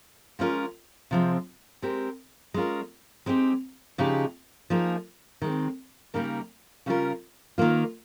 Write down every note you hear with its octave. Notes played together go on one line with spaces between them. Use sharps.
F3 G#3 C#4 F4 A#4
C3 F3 G#3 C4
G#3 C4 G4 A#4
G#3 C#4 F4 A#4
G#3 C4 D#4 G4
C#3 F3 G#3 D#4 G4
F3 A#3 D#4 G#4
D#3 G#3 C4
C#3 G3 A#3 D#4 A#4
C#3 G3 C#4 F4 A#4
D#3 A#3 F4